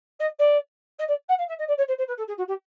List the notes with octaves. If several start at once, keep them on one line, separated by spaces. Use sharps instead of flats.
D#5
D5
D#5
D5
F#5
F5
E5
D#5
D5
C#5
C5
C5
B4
A4
G#4
F#4
G4